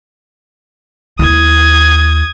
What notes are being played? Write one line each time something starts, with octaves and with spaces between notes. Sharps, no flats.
D#2 E4 D#6 G#6